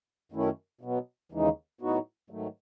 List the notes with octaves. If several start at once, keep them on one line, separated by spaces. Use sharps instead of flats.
F#2 D#3 A3 C#4 E4
B2 F#3 B3
D#2 C#3 E3 G#3 D#4
A2 F#3 B3 D#4 F#4
G#2 D#3 F#3 A3